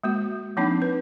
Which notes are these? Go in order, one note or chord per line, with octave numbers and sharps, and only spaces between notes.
G#3 A#3 F#4
F3 A#3 C4 D4 D#4
B4